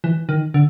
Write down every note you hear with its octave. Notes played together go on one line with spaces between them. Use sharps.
E3
D#3
D3